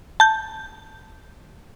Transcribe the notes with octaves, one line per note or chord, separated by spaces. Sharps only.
A5 G6